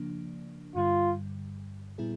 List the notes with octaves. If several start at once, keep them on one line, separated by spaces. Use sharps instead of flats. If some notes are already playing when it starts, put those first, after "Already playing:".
Already playing: C#3 F3 A#3 D4
G2 D3 G3 F4
A#2 G3 B3 E4 G#4